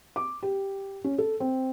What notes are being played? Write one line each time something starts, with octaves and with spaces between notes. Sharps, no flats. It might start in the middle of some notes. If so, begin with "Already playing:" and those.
D6
G4
C#4
A4
C4